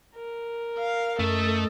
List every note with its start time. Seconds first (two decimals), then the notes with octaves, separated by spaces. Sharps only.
0.15 A#4
0.78 F5
1.19 F#2 A3 A4 D#5